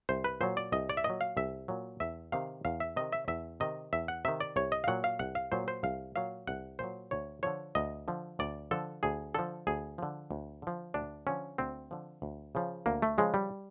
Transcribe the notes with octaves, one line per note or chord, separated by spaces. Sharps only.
C2 C5
B4
A#2 F#3 C5
D5
C2 D#5
D5
E5
A#2 D#5
F#3
F5
C2 E5
A#2 F#3
E2 E5
C3 D#3 F5
E2 F5
E5
C3 D#3 D#5
E5
E2 E5
C3 D#3 D#5
E2 E5
F#5
C3 D#3 E5
D5
C2 C#5
D#5
F5
A#2 F#3 F#5
F5
C2 F#5
F5
A#2 F#3 C5
C5
C2 F5
A#2 F#3 F5
C2 F#5
A#2 F#3 C5
D2 C#5
D3 F3 C#5
D2 D#5
D3 F3
D2 D5
D3 F3 A4
D2 G#4
D3 F3 A4
D2 G#4
D3 F3
D2
D3 F3
D2 D4
D3 F3 C#4
D2 C4
D3 F3
D2
C#3 F3
D2 A#3
A3
C#3 F3 G#3
G3